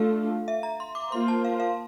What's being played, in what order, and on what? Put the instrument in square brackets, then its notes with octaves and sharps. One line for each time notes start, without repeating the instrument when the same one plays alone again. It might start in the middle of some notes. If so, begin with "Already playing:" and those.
Already playing: [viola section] A3 D4 F4 A4 [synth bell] F5
[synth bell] E5
A#5
C6
D6
[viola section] A#3 F4 C5 [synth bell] C6
[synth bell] A5
F5
F5